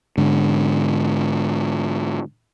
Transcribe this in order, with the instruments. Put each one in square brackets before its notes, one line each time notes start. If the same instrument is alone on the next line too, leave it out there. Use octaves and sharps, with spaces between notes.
[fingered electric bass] G#2 D3